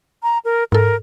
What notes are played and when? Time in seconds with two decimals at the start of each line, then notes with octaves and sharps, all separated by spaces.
0.23 A#5
0.45 A#4
0.72 G#2 A4 A#4